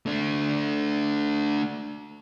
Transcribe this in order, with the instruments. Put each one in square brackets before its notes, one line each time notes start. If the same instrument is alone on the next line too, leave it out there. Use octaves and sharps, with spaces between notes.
[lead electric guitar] A3 D4